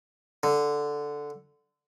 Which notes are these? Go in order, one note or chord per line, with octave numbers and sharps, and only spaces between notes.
D3